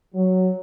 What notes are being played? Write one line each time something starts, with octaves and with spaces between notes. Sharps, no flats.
F#3